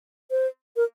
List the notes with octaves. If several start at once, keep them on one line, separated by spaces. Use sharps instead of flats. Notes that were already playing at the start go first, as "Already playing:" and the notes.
C5
A#4